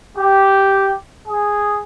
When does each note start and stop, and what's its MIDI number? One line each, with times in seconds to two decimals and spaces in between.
0.17 0.92 67
1.28 1.81 68